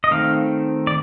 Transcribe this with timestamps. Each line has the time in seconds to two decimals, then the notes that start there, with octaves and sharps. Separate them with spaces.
0.04 D#5
0.11 D#3 A3 C4 F5
0.87 D5